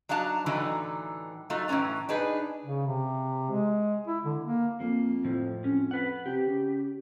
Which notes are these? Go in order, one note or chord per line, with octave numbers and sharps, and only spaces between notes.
F#3 D4 D#4 F5 A5 A#5
A2 D3 E3 F#3 D#4
F#3 A3 D#4 F4
A2 E3 G#3 C#4 A#5
D4 D#4 G#4 B4
C#3
C3
G#3
E4
D3
A#3
F2 A#3
A2 F3
F2 C#4
B4 F#5
C3 G4
C#3